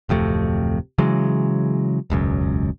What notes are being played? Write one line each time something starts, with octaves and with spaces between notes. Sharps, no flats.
D1 F2 C3 A3
C#3 E3 F#3 G#3
E1 C#2 F#2